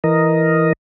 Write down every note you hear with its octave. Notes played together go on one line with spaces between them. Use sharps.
E3 A#4 D#5